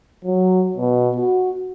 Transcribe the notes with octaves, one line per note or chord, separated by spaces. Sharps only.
F#3
B2
F#4